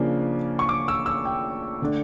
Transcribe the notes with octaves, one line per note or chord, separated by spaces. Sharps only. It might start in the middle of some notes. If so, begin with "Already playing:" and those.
Already playing: C#3 F3 A#3 D4
C#6
D6
E6
E6
G5
D3 A3 D4